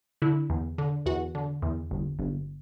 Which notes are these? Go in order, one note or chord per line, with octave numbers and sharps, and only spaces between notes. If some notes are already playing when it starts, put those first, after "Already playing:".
D3 E4
E2
D3
E2 F#4
D3
E2
G1
G1